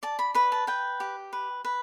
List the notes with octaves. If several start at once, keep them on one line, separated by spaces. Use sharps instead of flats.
D5 A5
B5
B4 B5
A5
B4 G5
G4
B4
B4